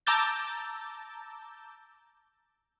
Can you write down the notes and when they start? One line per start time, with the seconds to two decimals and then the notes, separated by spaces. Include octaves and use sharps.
0.07 A5 A#5 D6 E6 G6 A6